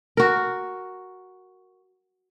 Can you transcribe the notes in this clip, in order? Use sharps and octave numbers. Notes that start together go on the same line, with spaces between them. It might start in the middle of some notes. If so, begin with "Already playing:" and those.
F#4 A#4